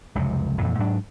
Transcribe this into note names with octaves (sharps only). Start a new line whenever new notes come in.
F1 C#2 F#2 C3
F2 A#2 E3
G#2 F#3 D4